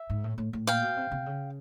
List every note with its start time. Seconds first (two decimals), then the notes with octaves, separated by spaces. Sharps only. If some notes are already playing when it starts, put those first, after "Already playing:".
Already playing: E5
0.10 G#2
0.24 A2
0.38 A2
0.53 A2
0.67 A#2 F5 G5
0.83 B2
0.97 C3
1.11 C3
1.26 C#3